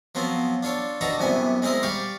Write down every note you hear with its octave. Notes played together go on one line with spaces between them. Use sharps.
F3 F#3 B3 C4 F4
D4 F4 A4 C#5
D4 D#4 F#4 A4 B4 A#5
C2 F#2 C3 B3 G#5
G#3 C4 E4 A#4 D#5
G3 D5 F5 G5 C#6